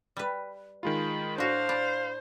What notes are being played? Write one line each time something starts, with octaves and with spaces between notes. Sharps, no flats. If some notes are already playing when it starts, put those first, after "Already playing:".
G3 B4
D#3 G#3 F4 B5
A2 D4 F#4 C5 F5
D4 B5